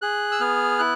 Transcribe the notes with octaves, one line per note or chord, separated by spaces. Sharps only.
G#4 F#6
E6
B3 F6
E4 F#6